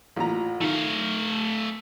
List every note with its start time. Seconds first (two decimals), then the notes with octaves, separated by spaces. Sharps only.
0.16 A1 A#2 A#5
0.61 D#3 A3 F5